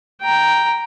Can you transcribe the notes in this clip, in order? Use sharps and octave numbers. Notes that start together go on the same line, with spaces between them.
G5 A#5